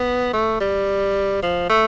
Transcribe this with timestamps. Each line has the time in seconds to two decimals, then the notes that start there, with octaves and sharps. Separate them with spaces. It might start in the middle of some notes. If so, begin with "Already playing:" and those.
Already playing: B3
0.33 A3
0.61 G3
1.42 F3
1.69 A3